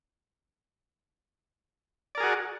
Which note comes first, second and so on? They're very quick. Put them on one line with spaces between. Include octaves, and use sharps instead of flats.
D5 A#4 G#4 F#4